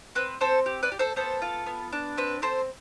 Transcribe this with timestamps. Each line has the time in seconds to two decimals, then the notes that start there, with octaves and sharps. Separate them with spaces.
0.15 C4 B4
0.41 C4 A4 C5
0.66 G4
0.83 B4 D5
0.92 G4
0.99 A4 C5
1.16 B3 A4 C5
1.42 F4
1.66 B3
1.92 D4
2.18 C4 B4
2.42 C4 A4 C5